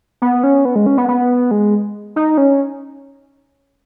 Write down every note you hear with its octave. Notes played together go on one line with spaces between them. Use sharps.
B3
C#4
B3
G#3
C#4
B3
B3
G#3
D#4
C#4